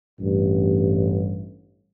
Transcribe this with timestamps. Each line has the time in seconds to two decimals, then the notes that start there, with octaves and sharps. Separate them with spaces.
0.20 A1 G2